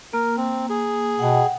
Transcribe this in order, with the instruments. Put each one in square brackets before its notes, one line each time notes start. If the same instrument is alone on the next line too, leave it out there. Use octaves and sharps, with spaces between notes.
[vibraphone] A#3 [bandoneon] A#4
[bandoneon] C4
G#4
[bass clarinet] B2 [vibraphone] F#5 G5